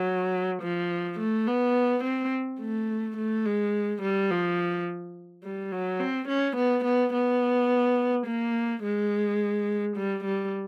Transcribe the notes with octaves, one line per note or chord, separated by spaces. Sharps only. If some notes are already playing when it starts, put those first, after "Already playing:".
Already playing: F#3
F3
A3
B3
C4
A3
A3
G#3
G3
F3
G3
F#3
C4
C#4
B3
B3
B3
A#3
G#3
G3
G3